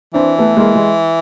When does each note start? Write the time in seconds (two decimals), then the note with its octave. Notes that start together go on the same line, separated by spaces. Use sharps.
0.14 E3 C4 D4
0.39 A3 B3
0.57 G#3 A#3
0.75 G#3